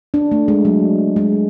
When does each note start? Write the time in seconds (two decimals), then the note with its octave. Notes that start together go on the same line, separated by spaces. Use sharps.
0.14 D4
0.31 A3
0.48 G#3
0.65 F#3
1.16 G#3